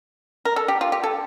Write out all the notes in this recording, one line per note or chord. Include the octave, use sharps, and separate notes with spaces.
A#4
A4
G4
F4
G4
A4